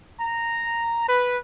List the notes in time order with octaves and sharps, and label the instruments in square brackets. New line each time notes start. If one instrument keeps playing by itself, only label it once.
[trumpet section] A#5
B4